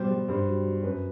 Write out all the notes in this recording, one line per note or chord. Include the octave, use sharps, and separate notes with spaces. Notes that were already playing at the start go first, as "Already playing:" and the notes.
Already playing: B2 G3 C5
G3
G2 C5
F#3
F#3
F#2 B4